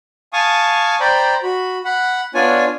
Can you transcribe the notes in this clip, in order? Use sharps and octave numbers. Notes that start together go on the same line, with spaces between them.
F5 G#5 A5 C#6 D#6
C5 D5 G5 A#5 B5
F#4 B5
F#5 B5
B3 D4 F4 C#5 D5 G#5